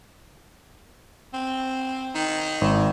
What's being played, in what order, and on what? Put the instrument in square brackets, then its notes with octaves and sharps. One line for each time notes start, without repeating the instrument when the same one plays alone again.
[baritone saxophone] C4
D#3
[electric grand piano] G#1